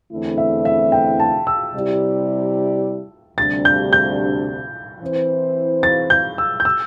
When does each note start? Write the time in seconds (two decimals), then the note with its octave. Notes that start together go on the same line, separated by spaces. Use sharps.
0.11 E2 D3 A3 C4 E4
0.38 E5
0.65 E5
0.92 G5
1.20 A5
1.47 E6
1.74 C3 G3 E4 G4 D5
3.38 D2 C3 G3 D4 A6
3.65 G6
3.93 G6
5.01 E3 C4 E4 C5
5.83 A6
6.10 G6
6.38 E6
6.60 G6
6.65 E6